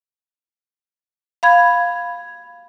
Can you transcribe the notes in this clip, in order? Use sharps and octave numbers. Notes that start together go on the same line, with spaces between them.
F5 B5 G#6